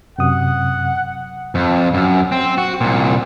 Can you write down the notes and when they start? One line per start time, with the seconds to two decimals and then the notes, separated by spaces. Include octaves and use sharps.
0.19 F#2 C3 F#5 D#6
1.55 F2
1.94 F#2
2.32 C4
2.58 F#4
2.81 C2 A#2